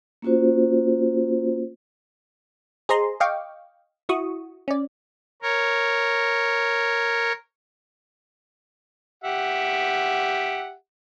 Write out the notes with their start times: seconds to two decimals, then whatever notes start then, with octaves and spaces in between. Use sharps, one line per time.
0.22 A#3 C#4 F4 F#4 C5
2.89 G#4 C5 D#5 A#5 C6
3.20 D#5 F5 G5 C#6 D6
4.09 E4 F#4 C#6 D#6
4.68 C#4 D5
5.42 A#4 C#5
9.24 G4 E5 F#5